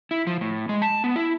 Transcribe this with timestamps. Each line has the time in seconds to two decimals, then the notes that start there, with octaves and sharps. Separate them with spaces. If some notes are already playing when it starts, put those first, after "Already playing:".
0.11 E4
0.27 F3
0.41 A2
0.69 G#3
0.82 A5
1.04 B3
1.16 E4